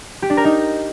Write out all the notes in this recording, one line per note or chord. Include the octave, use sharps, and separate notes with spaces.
G4
D4
A#4
D#4